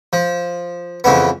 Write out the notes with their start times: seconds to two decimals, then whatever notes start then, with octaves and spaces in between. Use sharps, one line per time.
0.13 F3
1.04 F2 C#3 E3 B3